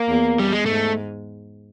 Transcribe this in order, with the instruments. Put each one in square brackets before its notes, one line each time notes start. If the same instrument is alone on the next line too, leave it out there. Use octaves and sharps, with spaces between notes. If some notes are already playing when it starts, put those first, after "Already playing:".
Already playing: [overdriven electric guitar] A#3
[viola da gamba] E2
[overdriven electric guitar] G3
G#3
[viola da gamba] G#2 [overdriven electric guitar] A3